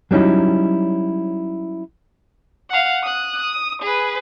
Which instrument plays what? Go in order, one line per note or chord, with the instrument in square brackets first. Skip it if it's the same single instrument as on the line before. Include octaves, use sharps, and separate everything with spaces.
[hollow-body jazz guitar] F#3 G3 C#4 D#4 E4
[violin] F5 F#5
D#6 F#6
D#6
G#4 B4